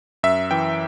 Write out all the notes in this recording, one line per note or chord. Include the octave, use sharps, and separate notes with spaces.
F#2 E5
E3 G5